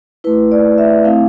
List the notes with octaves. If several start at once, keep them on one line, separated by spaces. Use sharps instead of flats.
A3 E4 B4
D5
E5
A3 C4 E4 F5